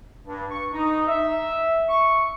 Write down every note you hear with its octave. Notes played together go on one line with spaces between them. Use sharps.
G2
C#6
D#4
E5
C#6